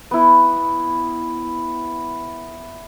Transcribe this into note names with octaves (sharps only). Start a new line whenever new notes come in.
B3 E4